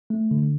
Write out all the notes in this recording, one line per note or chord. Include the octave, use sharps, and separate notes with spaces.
A3
D3